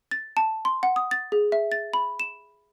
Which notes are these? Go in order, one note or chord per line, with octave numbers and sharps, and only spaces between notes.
A6
A5
C6
F#5
D#6
A6
G#4
E5
A6
B5
E7